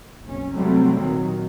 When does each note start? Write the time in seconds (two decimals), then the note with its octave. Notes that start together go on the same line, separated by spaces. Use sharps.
0.25 F#1 B1 C#4
0.56 C3 F#3 G3 A3 C4
0.99 D#2 A#2 D#3 F#3